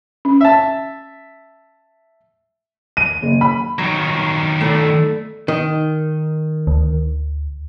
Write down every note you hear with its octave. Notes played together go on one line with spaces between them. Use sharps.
C#4
E5 A5
D#7
F#1
B5
D#3 F#3 D#4
A3 E4 D5
D#3
D2